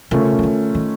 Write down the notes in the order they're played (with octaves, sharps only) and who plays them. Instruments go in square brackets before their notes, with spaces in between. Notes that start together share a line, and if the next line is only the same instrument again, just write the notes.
[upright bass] C#3 [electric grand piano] A3 C#4 F4 A#4
[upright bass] C#3
D3
D#3